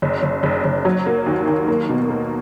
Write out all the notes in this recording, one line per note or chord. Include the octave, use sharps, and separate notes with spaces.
F#1
F#1
F#1
F#1
F#3
A#3
D#2
D#2
A#3
B2
A#3